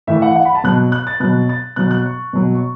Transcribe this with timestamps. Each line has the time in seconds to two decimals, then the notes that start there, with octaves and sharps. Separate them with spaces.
0.07 A2 E3 E5
0.22 F#5
0.36 F#5
0.45 B5
0.55 A5
0.64 B2 F#3 F#6
0.92 F#6
1.07 A6
1.20 B2 F#3 F#6
1.49 A6
1.76 B2 F#3 F#6
1.91 F#6
2.06 C#6
2.33 B2 F#3
2.55 C#6